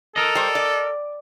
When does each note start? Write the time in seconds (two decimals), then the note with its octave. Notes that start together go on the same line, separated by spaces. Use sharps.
0.16 A4 A#4 D#5
0.35 G3 C5
0.55 D5